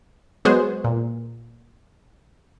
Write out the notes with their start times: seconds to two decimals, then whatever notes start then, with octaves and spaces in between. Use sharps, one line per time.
0.45 F#3 G#3 B3 F#4 G#4 C5
0.84 A#2